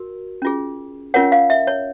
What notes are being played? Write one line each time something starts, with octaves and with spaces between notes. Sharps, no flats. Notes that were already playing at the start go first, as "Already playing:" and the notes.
Already playing: F#4 A#4
C#4 F4 G#4
C#4 F4 A#4 C#5 F#5
F5
E5
C#5